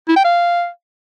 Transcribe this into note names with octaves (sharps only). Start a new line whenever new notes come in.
E4
G5
F5